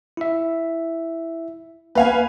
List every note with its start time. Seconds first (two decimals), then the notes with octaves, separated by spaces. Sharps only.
0.17 E4 E5
1.95 A#3 B3 B4 F5 G#5